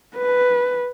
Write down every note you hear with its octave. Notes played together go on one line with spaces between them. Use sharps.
B4